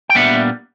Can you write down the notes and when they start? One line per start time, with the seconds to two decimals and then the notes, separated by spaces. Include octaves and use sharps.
0.09 G5
0.15 A#2 G3 B3 D4 E5 F#5